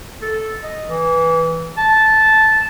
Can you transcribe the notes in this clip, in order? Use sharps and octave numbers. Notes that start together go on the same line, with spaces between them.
A4
D#5
E3
A5